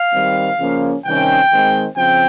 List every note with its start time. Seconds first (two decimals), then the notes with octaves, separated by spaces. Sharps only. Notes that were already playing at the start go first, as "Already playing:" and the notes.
Already playing: F5
0.13 D#3 G3 C4
0.59 C#3 F3 A#3 C#4
1.04 C3 D#3 G3 C#4 G5
1.50 D#3 G#3 C4
1.95 C#3 F3 C4 G5